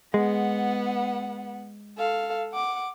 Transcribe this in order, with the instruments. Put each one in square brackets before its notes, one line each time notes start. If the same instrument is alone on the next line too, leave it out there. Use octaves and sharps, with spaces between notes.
[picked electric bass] G#3 [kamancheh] B3 F#5
[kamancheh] A4 F5
F#5 D6